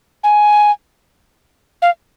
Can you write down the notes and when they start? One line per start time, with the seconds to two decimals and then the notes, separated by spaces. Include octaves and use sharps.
0.23 G#5
1.82 F5